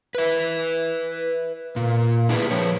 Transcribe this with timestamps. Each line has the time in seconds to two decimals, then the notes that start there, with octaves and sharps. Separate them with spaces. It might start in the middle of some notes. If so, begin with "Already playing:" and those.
0.15 B4 E5
1.76 A#2
2.29 D4 E4 G4 G#4 B4 D5
2.51 F3 B4 C#5